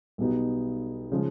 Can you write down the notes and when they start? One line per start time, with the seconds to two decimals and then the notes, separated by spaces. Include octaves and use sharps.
0.18 B1 B2 G3 B3 D#4
1.12 C#3 F3 G#3